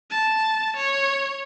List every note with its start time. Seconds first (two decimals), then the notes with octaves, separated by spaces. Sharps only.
0.11 A5
0.77 C#5